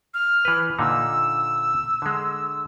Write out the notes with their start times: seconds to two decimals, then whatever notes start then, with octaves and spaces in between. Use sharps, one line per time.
0.14 F6
0.45 E3 B4
0.79 A#2 D3 D#4 E6
2.02 D3 G#3